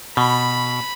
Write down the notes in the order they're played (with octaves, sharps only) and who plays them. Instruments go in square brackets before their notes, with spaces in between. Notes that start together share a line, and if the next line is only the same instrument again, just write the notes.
[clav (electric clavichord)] B2 [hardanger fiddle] B5